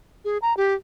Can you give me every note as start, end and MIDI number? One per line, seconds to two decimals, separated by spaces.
0.25 0.38 68
0.42 0.56 82
0.57 0.74 67